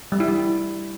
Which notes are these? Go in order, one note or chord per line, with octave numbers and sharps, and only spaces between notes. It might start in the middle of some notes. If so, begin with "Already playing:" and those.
G3
E4
G3